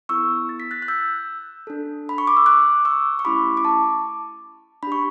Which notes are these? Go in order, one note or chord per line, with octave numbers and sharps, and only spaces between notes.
B3 E4 A4 C#6 E6
A6
B6
F#6 A6
F#6
E6 G6
D4 A4
B5
C#6
D6
E6
D6 F#6
C#6 E6
C#6
A3 C#4 E4 G4 B5 D6
D6
A5 C#6
D4 G4 B5 C#6